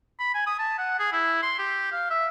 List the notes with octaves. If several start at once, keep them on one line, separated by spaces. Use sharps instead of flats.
B5
G#5
D#6
A5
F#5
G#4
E4
C6
G4
F5
E5